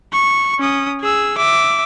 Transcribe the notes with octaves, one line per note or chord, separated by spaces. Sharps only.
C#6
C#4 D#6
G#4 E6
E5 D6